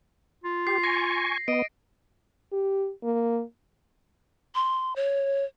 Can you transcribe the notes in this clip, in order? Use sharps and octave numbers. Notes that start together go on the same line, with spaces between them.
F4
G4 C7
G#5 C#6 A#6
B3 D#5 D7
G4
A#3
C6
C#5